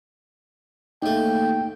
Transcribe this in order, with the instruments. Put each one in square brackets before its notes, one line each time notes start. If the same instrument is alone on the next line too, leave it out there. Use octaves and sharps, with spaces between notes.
[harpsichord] D#2 A3 [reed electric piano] D#4 [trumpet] G5